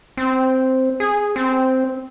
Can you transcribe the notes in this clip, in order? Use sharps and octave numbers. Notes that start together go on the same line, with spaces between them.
C4
G#4
C4